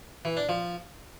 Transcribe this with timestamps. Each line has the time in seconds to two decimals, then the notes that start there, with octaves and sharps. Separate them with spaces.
0.25 E3
0.37 D4
0.49 F3